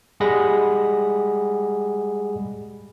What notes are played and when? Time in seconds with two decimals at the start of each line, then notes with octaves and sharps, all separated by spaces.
0.20 G3 G#3 G#4 F#5 B5 A#6